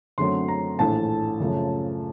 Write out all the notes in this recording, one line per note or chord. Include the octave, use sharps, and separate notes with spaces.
F#2 D3 F#3 A3 C4 C6
A#5
A#1 A2 E3 A3 A5
F#2 C#3 F3 A3